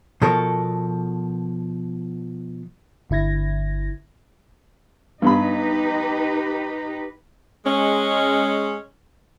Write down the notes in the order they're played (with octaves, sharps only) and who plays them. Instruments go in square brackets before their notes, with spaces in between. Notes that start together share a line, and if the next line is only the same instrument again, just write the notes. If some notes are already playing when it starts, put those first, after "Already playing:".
[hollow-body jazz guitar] B2 F3 A4 A#4 C#5
[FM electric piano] G1 D3 E4 G#6 A#6
[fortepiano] G2 B3 B5 [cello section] D#4 G4 B4
[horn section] G#3 C#4